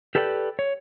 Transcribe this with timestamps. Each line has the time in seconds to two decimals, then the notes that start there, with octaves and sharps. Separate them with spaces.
0.15 G4 A4 B4 D5 F5 G5
0.59 C#5